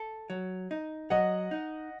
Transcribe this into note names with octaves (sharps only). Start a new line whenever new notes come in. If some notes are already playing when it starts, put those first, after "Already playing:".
Already playing: A4
F#3
D#4
F#3 D#5 F#5
D#4